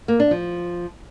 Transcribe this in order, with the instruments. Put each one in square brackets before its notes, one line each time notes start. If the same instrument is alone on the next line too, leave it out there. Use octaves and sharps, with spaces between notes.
[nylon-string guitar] A#3
D4
F3